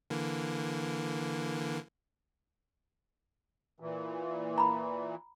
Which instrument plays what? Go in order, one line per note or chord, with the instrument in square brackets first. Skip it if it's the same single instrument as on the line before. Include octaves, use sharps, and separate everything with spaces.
[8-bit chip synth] D3 E3 A#3
[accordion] A#2 E3
[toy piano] A#5 B5